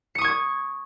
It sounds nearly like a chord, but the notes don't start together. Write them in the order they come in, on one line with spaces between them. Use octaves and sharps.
C#7 D#6 C#6 G#6